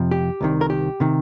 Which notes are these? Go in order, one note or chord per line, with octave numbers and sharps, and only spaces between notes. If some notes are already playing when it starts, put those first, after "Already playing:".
Already playing: F2 C3 F3
G4
C2 C3 D#3
A#4
G4
C3 D#3